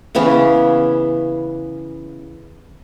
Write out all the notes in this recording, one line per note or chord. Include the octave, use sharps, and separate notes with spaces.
C#3 E3 B3 C#4